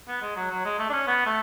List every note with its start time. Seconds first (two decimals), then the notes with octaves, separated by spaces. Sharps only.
0.08 B3
0.22 G#3
0.36 F#3
0.50 F#3
0.65 G#3
0.79 A3
0.89 D4
0.93 C#4
1.08 B3
1.26 A3